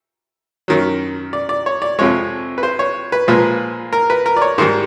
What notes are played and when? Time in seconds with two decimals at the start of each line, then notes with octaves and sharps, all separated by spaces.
0.68 F#2 D#3 F#3
1.33 D5
1.49 D5
1.66 C#5
1.82 D5
1.99 F2 C3 F3 G#3 C#5
2.58 B4
2.63 C5
2.79 C#5
3.12 B4
3.28 A#2 F3 G#3 B4
3.93 A#4
4.10 B4
4.26 A#4
4.37 D5
4.42 C#5
4.58 G#2 D#3 G3 C5